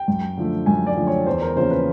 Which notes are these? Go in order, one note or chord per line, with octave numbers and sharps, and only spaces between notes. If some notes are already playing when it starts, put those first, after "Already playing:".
Already playing: G5
F#2
D3 F3 A3
F#2 G#5
D5
D3 F3 A3
C#5
E2 C5
A#4
C#3 F3 A#3 C#4 C5
B4